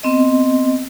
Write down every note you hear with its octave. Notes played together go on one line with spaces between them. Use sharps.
B3 C4 D#5